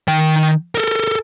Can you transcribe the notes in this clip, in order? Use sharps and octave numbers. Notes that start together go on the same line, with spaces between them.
D#3 G5
A4 A#4